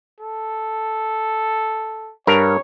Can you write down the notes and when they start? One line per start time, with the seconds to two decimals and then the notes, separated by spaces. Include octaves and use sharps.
0.20 A4
2.27 G2 A#4 C#5